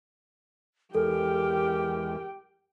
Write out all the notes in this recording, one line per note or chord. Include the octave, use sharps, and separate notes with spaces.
E2 G#3 G4 A4 A#4 G5